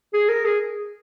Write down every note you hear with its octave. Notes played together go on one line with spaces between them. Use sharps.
G#4
A#4
G#4